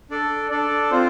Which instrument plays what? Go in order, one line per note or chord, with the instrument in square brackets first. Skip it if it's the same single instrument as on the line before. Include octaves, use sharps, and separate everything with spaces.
[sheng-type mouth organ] D4 A4 D5
D4 A4 D5
C4 F4 C5